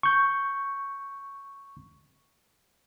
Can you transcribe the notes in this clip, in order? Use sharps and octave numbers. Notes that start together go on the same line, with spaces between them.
C#6 G6